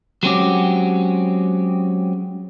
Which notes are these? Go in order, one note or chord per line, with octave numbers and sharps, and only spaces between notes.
F#3 G#3 C4 C#4 F#4 G4